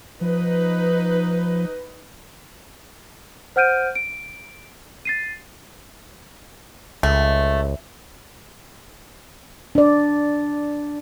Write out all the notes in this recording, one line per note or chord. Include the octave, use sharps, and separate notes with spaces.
F3 D#4 B4 D#5
C5 F#5 F6 G6 D7 D#7
D7
A6 C7 D#7
C#2 A3
D4 D5